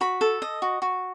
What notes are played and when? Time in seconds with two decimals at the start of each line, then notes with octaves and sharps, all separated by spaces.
0.01 F#4 B5
0.21 A4
0.42 D#5
0.62 F#4
0.82 F#4